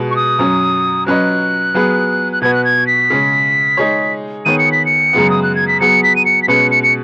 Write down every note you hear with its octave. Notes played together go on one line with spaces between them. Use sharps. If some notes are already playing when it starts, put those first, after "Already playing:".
Already playing: B2 G#3 B3
C#6
D#6
F#2 F#3 C#4
F#3 C#4 B4 D#5 F#6
F#3 B3 G#4 B4
F#6
B2 B3 F#4 B4 G#6
F#6
G#6
B6
C#3 G#3 C#4
G#3 D#4 G#4 C#5
D#3 B3 G#4 C#5 D#7
C#7
B6
C#7
F#2 C#3 G#3 B3
D#6
F#6
G#6
B6
F#3 B3 G#4 C#7
B6
D#7
C#7
B6
B2 G#3 C#4 B4 C#7
C#7
C#7